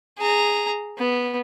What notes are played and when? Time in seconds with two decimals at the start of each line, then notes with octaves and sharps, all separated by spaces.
0.18 G#4 A#5
0.98 B3